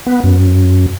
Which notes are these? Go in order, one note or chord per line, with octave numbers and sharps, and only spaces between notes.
B3
F#2